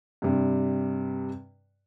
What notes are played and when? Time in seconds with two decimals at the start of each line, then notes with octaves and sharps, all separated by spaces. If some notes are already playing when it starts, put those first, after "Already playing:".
0.22 G2 C3 G3